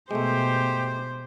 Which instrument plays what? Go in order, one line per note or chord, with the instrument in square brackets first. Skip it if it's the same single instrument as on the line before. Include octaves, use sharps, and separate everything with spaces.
[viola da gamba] B2 [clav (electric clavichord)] G#3 A3 [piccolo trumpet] G4 [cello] C5